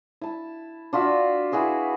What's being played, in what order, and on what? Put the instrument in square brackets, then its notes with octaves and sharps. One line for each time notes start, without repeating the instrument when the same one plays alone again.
[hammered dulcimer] E4 A5
D4 F4 F#4 E5
E4 F#4 G#4 B4